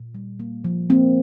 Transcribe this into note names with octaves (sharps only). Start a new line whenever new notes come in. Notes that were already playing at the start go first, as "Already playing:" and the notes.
Already playing: A#2
G3
A#3
F3
A#3 C4